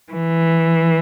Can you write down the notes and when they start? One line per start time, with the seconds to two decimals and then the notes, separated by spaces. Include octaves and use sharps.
0.13 E3